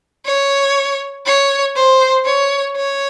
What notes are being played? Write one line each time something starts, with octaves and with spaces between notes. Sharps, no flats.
C#5
C#5
C5
C#5
C#5